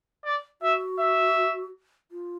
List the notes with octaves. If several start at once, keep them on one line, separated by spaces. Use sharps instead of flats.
D5
F#4 E5
E5
F4